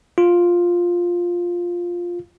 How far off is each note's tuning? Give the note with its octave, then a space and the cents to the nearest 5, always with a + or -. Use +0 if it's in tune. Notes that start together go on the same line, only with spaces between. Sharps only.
F4 +5